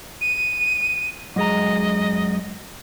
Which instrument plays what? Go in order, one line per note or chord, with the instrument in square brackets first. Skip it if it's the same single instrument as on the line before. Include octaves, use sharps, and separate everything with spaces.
[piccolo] D#7
[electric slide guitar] F#2 G#3 A#5 [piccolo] D#5